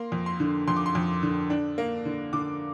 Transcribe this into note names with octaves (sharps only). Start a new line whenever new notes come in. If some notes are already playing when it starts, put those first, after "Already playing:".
Already playing: A#3 C6
F2
C6
D3
F2 C6
D6
C6
F2
D3
D4
A#3
D3
D3 D6